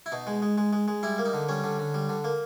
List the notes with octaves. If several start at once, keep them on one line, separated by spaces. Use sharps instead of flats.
E4
B2 D#4
G#3
G#3
G#3
G#3
G#3
G3 E4
A#3
D#4
D3
G3 C#4
D3
D3
G3
D3
A#3